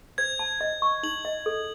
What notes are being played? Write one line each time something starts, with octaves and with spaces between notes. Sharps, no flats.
C5 G#6
A5
D#5
C#6
D#4 F#7
D#5
A4